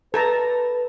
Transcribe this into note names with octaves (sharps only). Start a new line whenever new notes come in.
A4 B4 A5 A#5